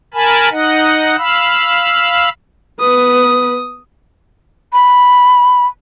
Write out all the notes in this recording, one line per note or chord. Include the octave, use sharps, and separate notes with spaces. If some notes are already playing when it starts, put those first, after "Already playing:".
A#4 G#5 A5 B5
D#4 D#5 F#5
F5 B5 E6
B3 B4 D#6
B5